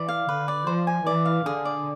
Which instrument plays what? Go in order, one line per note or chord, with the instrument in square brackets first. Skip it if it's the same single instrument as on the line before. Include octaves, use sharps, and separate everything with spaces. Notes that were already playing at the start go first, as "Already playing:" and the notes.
Already playing: [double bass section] E3 [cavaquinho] D5
[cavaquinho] F5
[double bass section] D3 [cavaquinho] B4
[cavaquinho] D5
[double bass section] F3 [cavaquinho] C5
[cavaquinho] G#5
[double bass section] E3 [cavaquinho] D5
[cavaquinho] F5
[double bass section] D3 [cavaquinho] G#4
[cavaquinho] D5